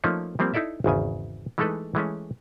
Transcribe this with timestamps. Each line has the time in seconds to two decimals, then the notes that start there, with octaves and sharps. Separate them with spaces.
0.04 F3 A3 A#3 C#4 D#4
0.39 F3 G3 A#3 C4
0.54 D#4 E4 A4 D5 E5
0.84 G#1 E2 C#3 G#5
1.58 E3 G#3 A3 D#4 A4 B4
1.95 E3 G#3 A3 C#4